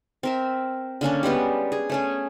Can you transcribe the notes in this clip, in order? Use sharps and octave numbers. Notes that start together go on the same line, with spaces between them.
C4 A#4 E5
D3 A#3 C#4 D4
G3 G#3 B3 G4
G#4
A3 C#4 G#4